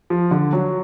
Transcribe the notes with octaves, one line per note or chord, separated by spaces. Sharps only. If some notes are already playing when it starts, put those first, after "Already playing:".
F3
D3
F#3